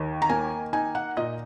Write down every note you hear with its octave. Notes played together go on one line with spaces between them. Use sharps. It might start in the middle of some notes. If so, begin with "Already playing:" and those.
Already playing: D#2 D#3
A#5
A#3 G#5
D#4 G#5
F#5
A#2 D#5